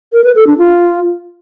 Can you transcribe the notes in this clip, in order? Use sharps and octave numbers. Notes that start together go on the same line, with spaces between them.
A#4
B4
A4
D4
F4